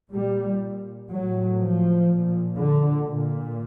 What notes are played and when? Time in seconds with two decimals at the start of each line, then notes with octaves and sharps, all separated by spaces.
0.11 A#2 G3
1.10 A2 F#3
1.59 F3
2.09 A#2
2.58 D3
3.07 A#2